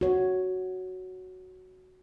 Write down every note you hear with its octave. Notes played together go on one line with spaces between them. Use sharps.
F#4 C#5